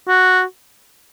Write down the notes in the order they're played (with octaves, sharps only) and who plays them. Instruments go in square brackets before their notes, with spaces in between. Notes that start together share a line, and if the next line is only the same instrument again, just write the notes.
[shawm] F#4